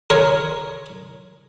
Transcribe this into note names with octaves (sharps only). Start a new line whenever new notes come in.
A#4 C#5